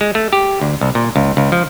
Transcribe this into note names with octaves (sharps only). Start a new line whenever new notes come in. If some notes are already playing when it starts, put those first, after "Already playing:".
G#3
A3
G4
D2
C2
A#2
C#2
C#2
F3